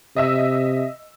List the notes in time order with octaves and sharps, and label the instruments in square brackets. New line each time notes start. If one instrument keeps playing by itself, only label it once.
[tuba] C3 [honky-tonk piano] D#5 E5 E6